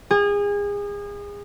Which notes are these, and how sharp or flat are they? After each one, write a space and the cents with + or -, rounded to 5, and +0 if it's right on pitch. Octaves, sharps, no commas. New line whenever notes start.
G#4 -30